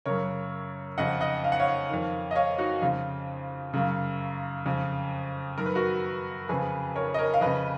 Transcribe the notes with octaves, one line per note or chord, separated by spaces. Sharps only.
F#2 C#3 A#4 C#5
F2 C#3 D#5 F#5
D#5 F#5
F5
F#5
C#5 F5
F2 D#3
D#5
C#5 F5
D#4 F#4
F2 C#3 F4
F#2 C#3 F4
F2 C#3
F#2 D#3 A#4
B4
F#4 A#4
F2 C#3 G#4 B4
A#4 C#5
D#5
A#4 C#5
F5
F2 C#3 B4 D#5